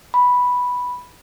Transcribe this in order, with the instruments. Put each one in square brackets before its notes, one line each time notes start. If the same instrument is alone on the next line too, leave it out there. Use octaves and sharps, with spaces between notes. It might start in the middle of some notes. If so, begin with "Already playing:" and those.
[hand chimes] B5